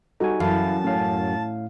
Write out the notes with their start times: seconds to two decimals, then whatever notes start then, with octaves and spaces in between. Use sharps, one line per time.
0.20 G3 D#4 F#4 A4 G#5
0.40 F#2 E3 E4 A4 F5 A5
0.84 A2 C#4 F5